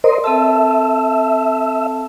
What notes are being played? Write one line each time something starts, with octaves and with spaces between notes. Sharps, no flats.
A#4 C5 D5 D#5 C6
C4 A4 E5 A5